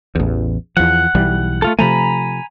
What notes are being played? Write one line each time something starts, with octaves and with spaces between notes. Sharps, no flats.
A1 E2
E2 F3 F#5
B1 E3 G3
A3 F4 A4
C3 F3 A3 G#5 A#5 B5